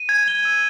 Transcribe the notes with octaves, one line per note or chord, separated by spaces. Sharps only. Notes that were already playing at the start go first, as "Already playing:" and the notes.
Already playing: D#7
G#6
G7
E6